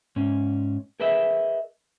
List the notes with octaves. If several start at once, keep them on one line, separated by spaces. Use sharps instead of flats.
G#2 C#4
G#4 A#4 B4 D#5 E5